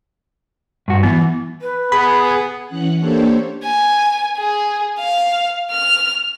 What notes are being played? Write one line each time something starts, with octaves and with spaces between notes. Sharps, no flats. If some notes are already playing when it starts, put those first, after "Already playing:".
G2 F#4
E3 B3
B4
B3 G#4 B5
E3 C#4 F#5 F#6
A#3 D4 G4 A4 C5 C#5
G#5
G#4
F5
F6